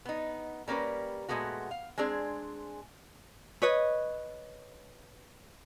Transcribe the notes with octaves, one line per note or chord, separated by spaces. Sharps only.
B3 D#4
G3 A#3 C#4 A#4 B4
A#2 F3 G#3 A3 B3 F#4
F5
G#3 C4 D4 G#4
B4 C#5 D#5